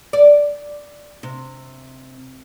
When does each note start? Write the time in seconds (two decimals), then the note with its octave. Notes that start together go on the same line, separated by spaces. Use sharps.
0.13 D5
1.23 C3